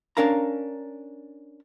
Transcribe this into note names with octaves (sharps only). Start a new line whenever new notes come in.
C#4 D4 A#4 F5 A#5